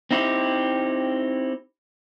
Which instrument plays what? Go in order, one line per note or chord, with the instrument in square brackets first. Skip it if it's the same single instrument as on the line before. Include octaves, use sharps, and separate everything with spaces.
[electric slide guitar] C4 D#4 E4 G4